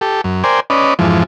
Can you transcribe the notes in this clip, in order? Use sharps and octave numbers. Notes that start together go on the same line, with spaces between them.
G4 A4
F#2
A#4 C5 D5 G5 G#5
C#4 B4 D5 D#5
F2 G#2 E3 F3